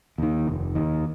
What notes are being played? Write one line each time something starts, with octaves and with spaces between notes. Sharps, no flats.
D#2 D#3
F1
D#2 D#3